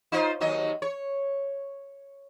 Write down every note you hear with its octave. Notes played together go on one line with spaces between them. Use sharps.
D#4 F4 C5
D#2 F#3 D#5
C#5